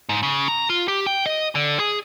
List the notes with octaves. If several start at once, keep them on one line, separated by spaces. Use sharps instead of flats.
G#2
C#3
A#5
F4
G4
G5
D#5
D3
G#4